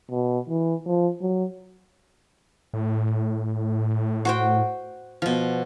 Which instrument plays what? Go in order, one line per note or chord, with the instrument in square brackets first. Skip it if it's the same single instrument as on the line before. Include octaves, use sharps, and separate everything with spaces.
[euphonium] B2
E3
F3
F#3
[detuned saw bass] A2
[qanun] F#4 C5 G5
B2 F3